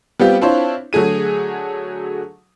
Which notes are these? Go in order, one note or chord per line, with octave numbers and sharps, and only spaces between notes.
G3 B3 C4 F4 G4
C4 D4 E4 F4 C5 C#5
D3 F#3 A3 G#4 D#7